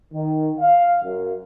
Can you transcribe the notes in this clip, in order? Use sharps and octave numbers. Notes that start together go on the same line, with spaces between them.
D#3
F5
F#2